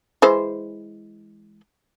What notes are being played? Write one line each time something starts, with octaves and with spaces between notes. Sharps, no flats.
E3 G#3 C5